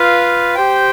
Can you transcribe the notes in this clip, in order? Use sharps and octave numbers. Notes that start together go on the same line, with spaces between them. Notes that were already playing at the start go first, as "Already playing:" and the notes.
Already playing: F4 B4 F5
G4 C5 G5